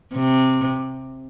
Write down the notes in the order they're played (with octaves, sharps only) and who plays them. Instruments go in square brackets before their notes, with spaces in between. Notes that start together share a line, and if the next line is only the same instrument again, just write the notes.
[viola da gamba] C3